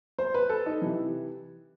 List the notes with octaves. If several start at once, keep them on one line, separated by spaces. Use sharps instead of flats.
C5
B4
A4
D#4
C3 E3